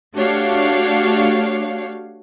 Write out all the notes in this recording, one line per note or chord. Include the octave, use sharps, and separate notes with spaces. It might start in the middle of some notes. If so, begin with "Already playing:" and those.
A3 D4 F#4 G4 C#5 F5